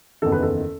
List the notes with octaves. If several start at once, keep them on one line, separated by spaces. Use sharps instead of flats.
F#1 E2 D#3 A4
B4
A4